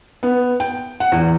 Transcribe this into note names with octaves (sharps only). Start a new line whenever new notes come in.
B3
G5
F#5
E2